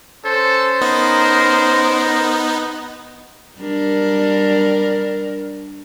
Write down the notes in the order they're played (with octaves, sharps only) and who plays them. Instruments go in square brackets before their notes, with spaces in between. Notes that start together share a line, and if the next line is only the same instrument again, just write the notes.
[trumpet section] C#4 C5 [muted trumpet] A4
[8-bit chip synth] B3 D#4 [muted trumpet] A#4
[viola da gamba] G3 D4 A#4